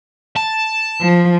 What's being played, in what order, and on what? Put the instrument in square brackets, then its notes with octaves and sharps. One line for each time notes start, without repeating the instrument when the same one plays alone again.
[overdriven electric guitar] A5
[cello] F3